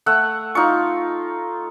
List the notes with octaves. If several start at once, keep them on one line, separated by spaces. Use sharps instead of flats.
A3 E5 F#5
D#4 F4 C#6